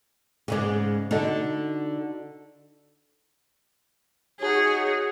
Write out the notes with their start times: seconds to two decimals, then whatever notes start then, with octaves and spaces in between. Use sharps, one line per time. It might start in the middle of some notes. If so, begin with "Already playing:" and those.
0.48 G#2 C#3 G#3 G#4 D5
1.11 D3 D#4 F#4 A4
4.40 D#4 F#4 G#4 C#5